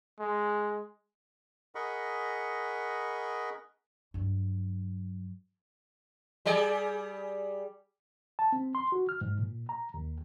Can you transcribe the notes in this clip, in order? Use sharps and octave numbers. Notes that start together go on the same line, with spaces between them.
G#3
G#4 A#4 D#5 F#5 B5 C#6
G2 F#3
G3 G#4 D5
A5
C4
C6
F#4
F6
G#2
A#2
A#5
D#2